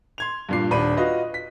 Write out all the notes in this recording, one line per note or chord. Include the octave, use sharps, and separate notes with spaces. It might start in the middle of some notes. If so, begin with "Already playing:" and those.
C6 G#6 F7
G2 A#2 C7
D#1 D4 B5 D#7
F4 F#4 B4 D#5
B6